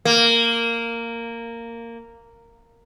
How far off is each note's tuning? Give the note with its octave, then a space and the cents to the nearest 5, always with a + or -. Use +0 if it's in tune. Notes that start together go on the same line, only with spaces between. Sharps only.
A#3 -10